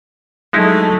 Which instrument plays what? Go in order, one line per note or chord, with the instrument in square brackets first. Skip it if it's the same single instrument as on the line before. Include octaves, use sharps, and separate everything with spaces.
[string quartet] F#3 A3 [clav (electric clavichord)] G#3 D#4 E4